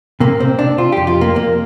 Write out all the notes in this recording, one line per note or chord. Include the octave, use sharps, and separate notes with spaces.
C3 A#3
C3 C4
C3 D4
C3 F4
F2 G4
F4
C3
A#3
F2 A#3